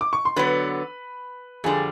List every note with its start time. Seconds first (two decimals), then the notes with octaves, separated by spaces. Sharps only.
0.01 D6
0.13 C#6
0.25 C6
0.36 D3 F#3 B3 B4 B5
1.64 F2 D3 G3 G#4 G#5